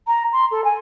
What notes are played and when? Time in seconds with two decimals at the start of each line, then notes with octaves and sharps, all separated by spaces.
0.07 A#5
0.33 C6
0.51 A4
0.64 G#5